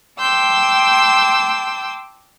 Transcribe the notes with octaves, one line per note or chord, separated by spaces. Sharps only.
G5 A5 C6 D6 E6 G6